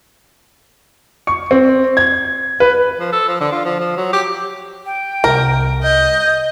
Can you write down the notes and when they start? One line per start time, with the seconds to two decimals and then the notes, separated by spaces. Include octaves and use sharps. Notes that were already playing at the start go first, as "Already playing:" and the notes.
1.27 C#6
1.51 C4
1.97 G#6
2.60 B4
3.00 F3
3.12 A4
3.28 F3
3.40 D3
3.52 F4
3.65 F3
3.79 F3
3.97 F#3
4.13 G4
4.86 G5
5.24 C2 A#4
5.84 D#5 G6